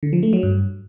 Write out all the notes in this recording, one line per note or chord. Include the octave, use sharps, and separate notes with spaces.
D3
F3
A3
F#3
G2